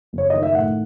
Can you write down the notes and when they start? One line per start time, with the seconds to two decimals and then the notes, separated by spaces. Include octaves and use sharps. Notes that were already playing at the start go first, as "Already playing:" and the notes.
0.13 F#1
0.18 C#5
0.30 D#3 D#5
0.43 E5
0.55 A2 F#5